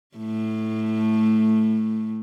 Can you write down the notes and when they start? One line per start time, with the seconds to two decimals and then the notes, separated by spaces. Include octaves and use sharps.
0.17 A2 A3